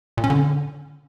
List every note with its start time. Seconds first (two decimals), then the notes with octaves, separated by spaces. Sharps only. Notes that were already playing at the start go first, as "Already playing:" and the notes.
0.17 A#2
0.24 C#4
0.30 D3